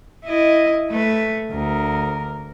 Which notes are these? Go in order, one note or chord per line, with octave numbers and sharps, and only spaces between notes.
E4 D#5
A3 B4
D2 A#4